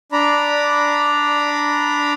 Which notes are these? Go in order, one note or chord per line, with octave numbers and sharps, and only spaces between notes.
D4 D5 A#5 B5